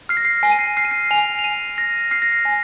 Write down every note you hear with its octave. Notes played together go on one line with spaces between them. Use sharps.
F6 C7
A#6
C7
G#5 C7
D#7
C7
F6 C7
D#7
C7
G#5 F7
F7
G#5 D#7
F6 A#6
F6 C7
A#6
C7
G#5